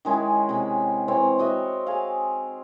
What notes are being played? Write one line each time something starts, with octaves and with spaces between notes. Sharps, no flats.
D#3 G#3 C#4 E4
C3 G#4 B5
E3 C4 C#5
F#4 D#5 E5 F#5
G#4 F5